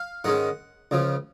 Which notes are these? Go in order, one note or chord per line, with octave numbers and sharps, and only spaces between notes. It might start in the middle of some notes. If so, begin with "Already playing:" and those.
Already playing: F5
G#2 D#3 G#3 C#4 F#5
C#2 C#3 F3